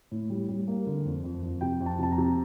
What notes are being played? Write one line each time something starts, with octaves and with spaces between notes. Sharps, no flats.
A2
G3
G3
A#3
D3
F2
F2
F2
C3 G5
F2
A5
C3 A5
A#5
C3